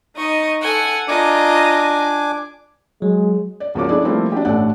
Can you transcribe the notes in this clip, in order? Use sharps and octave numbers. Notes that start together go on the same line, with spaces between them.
D#4 D#5 C#6
A4 F#5 G#5
D4 F4 D#5 G#5 A#5 D6
F#3 G#3
D5
C#2 F3 A#3 F#4 C#5 D6
D4 E4 G#4 A4 D5
F3 G3 A3 A#3 C4 E4
D4 F#4 G4
A1 A2 A3 D4 D5 F#5